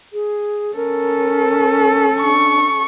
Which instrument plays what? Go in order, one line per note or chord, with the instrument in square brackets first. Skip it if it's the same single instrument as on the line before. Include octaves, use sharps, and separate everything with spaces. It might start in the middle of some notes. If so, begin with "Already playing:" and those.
[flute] G#4
[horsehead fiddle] C#4 A4 [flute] A#4
[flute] D4 [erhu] C#6